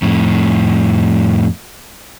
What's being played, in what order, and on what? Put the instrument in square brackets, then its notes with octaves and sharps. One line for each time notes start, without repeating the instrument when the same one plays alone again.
[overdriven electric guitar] F2 A2